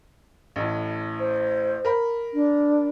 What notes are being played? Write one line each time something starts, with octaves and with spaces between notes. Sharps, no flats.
A1 A2
C5
A#4 B5
D4